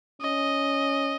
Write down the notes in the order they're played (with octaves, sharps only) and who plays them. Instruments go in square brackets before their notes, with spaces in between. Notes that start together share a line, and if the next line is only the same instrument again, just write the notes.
[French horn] C#4 [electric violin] D#5